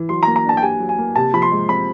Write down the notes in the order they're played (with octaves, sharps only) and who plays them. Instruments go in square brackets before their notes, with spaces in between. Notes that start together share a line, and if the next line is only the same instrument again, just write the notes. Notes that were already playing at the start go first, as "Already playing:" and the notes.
Already playing: [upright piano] E3
[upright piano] F#3 [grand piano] C6
[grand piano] A#5
[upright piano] A#3
[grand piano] A#5
[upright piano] D4 [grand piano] A5
[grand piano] G5
[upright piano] G4 [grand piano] G#5
[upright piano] F#3
[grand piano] G#5
[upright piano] A#3
[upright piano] C3 [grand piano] A5
[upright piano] F3 [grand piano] B5
[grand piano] C6
[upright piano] G#3
[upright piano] C4 [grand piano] B5